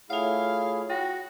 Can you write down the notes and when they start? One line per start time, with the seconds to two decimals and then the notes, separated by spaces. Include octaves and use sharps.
0.10 A3 E4 F4 G#4 C#5 F5 F#5 F7
0.90 F#4 G5 A#6